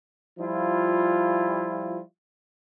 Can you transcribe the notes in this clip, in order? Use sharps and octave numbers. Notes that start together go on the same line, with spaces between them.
F3 G3 E4 F4